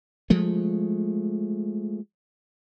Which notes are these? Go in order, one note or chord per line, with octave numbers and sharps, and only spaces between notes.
F3 G#3 A3